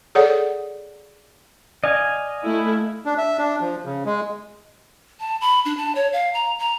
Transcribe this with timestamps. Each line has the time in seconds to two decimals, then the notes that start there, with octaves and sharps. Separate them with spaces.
0.15 G#4 A4 C#5 D5 F#5
1.84 D5 D#5 F5 G#5
2.44 A3 E4
3.05 D4
3.18 E5
3.38 D4
3.61 F3
3.85 C#3
4.05 G#3
5.20 A5
5.41 B5
5.65 D4
5.77 A5
5.95 C#5
6.13 F5
6.34 A#5
6.59 A#5